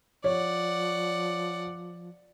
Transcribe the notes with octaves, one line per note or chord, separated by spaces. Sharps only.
F3 C#5 D5 F#5